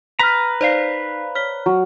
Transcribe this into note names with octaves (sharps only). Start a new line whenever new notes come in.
B4 A#5 F6 B6
D#4 C5 D5 F5 C7
C#5 F6 B6 G7
F#3